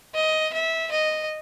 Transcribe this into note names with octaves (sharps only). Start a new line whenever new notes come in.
D#5
E5
D#5